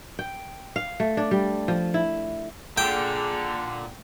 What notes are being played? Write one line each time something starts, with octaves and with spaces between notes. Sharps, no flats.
G5
F5
A3
D4
G3
F3
E4
A#2 D3 G#4 G5